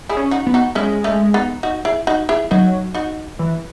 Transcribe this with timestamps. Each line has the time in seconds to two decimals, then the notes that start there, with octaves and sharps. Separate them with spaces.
0.09 E4 G#4
0.17 C#4
0.31 D#4 F#4
0.47 B3
0.54 D#4 F#4
0.75 G#3 C#4 E4
1.04 A3 C#4
1.34 B3 D#4
1.63 D#4 F#4
1.85 E4 G#4
2.07 D#4 F#4
2.29 E4 G#4
2.51 F#3 D#4 F#4
2.94 D#4 F#4
3.39 E3